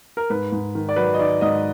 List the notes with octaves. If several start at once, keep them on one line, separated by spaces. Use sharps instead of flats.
A#4
G#2 B4
G#2
D#3
D5
F#3 B4
D#5
D#3 D5
G#2 D#5